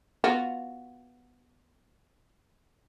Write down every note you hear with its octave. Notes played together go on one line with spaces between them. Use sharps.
B3 F4 F#4